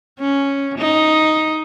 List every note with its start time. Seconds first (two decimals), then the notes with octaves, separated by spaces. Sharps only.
0.20 C#4
0.78 D#4